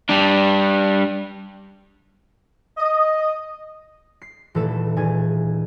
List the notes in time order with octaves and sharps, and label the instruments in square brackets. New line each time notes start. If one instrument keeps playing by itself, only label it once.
[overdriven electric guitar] G3 D4
[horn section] D#5
[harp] C7
D#1 E3 A3 B3 A4 E7
D#1 G#4 G#5 A6